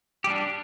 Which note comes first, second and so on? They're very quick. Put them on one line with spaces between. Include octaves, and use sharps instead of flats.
G4 G3 D4